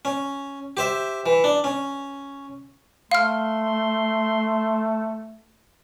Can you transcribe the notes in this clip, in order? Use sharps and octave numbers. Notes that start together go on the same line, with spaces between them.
C#4
G4 C5 E5
E3
D4
C#4
A3 F5 C6 F6